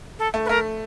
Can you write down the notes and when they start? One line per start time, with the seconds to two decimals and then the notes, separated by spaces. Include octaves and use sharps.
0.19 A4
0.34 A3
0.45 B4
0.49 A3 A#4